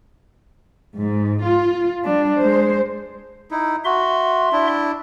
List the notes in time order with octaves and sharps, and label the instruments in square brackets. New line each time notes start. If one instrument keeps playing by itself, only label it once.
[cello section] G#2
F4
[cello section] G3 [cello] D4
[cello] G#3 [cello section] C5
[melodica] D#4 E4
[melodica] F#4 [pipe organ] E5 C6
[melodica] D4 E4